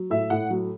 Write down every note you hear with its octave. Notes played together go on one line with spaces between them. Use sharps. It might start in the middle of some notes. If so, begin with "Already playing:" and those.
Already playing: F#3
A2 E5
A2 F#5
F#3